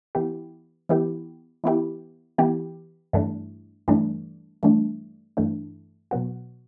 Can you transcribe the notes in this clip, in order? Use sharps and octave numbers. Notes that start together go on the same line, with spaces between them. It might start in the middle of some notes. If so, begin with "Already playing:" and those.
E3 B3 E4 G4
E3 B3 E4 G4
E3 B3 E4 G4
E3 B3 E4 G4
G2 E3 A3 D4
G2 E3 A3 D4
G2 E3 A3 D4
G2 E3 A3 D4
B2 F#3 B3 F#4